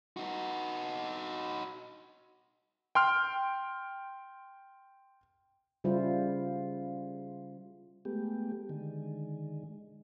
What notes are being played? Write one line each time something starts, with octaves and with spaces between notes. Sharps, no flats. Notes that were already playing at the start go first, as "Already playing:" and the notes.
D#4 F#4
G5 C6 F6
C#3 G3 E4 F4 C5
G#3 A3 B3 G4
D3 D#3 G#3